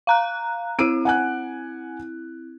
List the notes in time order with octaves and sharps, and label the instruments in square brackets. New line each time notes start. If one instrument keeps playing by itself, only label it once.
[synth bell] F5 A#5 F#6
[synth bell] C4 E4 [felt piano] E6 D7 D#7
[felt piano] F#5 G#5 F#6